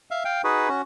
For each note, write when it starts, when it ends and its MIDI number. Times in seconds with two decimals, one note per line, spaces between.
0.11 0.24 76
0.11 0.24 77
0.25 0.42 77
0.25 0.42 79
0.44 0.69 63
0.44 0.69 66
0.44 0.69 68
0.44 0.69 71
0.69 0.82 61
0.69 0.82 66